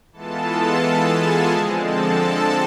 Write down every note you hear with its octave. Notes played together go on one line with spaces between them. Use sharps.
E3 G#3 B3 F4 A4 A5
G#4 G#5
D3 F3 G#3 C4
A4 A5